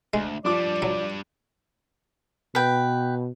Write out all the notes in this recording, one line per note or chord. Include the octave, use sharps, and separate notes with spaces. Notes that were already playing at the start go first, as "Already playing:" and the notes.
D2 G#3
F3 G3 D4 D5 D6
F#3
B2 B4 G5